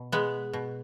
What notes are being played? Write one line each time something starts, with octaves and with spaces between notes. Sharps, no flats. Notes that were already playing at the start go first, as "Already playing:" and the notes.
Already playing: B2
G#3 B3
B2